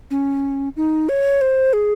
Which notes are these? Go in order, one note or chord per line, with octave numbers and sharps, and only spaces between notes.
C#4
D#4
C#5
C5
G#4